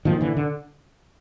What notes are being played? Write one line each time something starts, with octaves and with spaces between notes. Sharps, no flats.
A#2 D#3 F3
D3 E3
D3